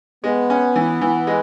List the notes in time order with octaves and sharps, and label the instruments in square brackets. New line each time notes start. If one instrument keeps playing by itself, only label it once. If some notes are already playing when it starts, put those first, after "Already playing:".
[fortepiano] G#3 [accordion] B3
[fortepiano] C#4
E3
E3
G#3